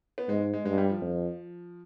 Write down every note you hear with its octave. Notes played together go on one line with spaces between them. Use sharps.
B3
G#2 G#3
G#3
G2 G#3
G3
F3
F2